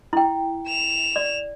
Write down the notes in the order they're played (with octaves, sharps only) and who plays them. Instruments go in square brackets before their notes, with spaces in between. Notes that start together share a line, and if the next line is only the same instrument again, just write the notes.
[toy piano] E4 G5
[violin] E7 F7
[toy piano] D5